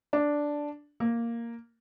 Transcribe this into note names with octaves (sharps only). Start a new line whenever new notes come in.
D4
A#3